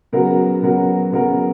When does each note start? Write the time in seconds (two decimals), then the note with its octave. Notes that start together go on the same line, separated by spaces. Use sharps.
0.12 C#3 F#3 B3 F#4 A#4
0.62 C#3 F#3 B3 F#4 A#4
1.12 C#3 F#3 B3 F#4 A#4